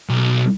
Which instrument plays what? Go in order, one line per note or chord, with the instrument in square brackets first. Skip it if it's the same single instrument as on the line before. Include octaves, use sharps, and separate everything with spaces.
[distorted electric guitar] B1